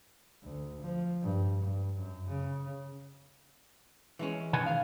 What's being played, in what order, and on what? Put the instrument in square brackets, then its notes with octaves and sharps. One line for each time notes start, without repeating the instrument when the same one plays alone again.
[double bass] D2
F3
G2
G2
F#2
C#3
[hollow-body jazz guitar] E3 G#3 C#4
[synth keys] B2 [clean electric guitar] D#3 F#5 G#5
[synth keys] F5